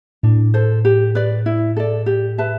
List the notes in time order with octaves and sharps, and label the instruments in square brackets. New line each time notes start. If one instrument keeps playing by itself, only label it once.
[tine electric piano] A2 [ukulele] D4
[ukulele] A4 C5
G4
B4 D5
E4
A4 D5
G4
B4 E5 A5